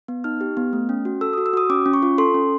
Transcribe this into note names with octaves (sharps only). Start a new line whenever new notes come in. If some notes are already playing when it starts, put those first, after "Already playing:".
B3
D#4 F6
G4
B3
A3
C#4
F#4
A4 E6
F#4 D#6
E6
F#4 D#6
C#4 D6
C#4
C#6
F4
A4 C6
C#4